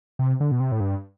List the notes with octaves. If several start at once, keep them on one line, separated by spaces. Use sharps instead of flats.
C3
D3
B2
C3
A2
G2